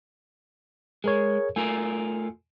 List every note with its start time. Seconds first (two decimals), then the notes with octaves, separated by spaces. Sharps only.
1.04 G#3 G#4 A#4 C#5
1.56 A3 F4 A#4 G#5